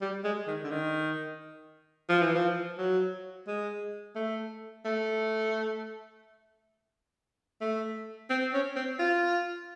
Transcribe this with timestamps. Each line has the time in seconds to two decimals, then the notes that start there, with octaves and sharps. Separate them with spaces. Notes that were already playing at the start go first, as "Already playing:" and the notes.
0.02 G3
0.24 G#3
0.47 D#3
0.64 D3
0.71 D#3
2.09 F3
2.22 E3
2.35 F3
2.78 F#3
3.48 G#3
4.16 A3
4.85 A3
7.61 A3
8.30 C4
8.54 C#4
8.76 C4
9.00 F4